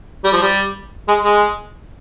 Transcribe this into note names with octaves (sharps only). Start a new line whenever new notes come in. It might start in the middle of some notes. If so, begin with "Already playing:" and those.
G3
F3
G3
G#3
G#3